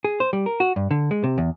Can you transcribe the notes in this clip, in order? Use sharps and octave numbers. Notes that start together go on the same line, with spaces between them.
G#4
C5
G3
A#4
F#4
G2
D3
G#3
C3
E2